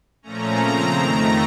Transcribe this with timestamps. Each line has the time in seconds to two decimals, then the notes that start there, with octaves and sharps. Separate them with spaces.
0.22 A#2 F3 A3 C#4 A#5
0.58 C#3 F3 C4
0.94 F2 D#3 A3 A#5